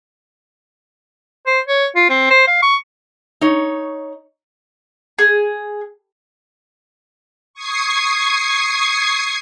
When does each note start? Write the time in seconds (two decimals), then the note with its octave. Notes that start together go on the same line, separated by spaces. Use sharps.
1.47 C5
1.68 C#5
1.96 F4
2.10 C4
2.31 C5
2.48 F5
2.63 C#6
3.41 D#4 C#5
5.19 G#4
7.54 C#6 D#6 G#6 C7